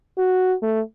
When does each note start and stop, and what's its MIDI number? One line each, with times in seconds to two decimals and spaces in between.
0.18 0.54 66
0.63 0.81 57